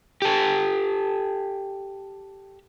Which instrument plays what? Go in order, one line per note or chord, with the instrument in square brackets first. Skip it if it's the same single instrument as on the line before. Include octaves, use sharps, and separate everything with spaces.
[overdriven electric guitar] G4 A4